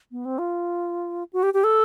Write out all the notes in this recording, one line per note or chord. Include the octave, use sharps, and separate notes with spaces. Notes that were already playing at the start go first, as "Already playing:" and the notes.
B3
C4
F4
F#4
G4
G4
A4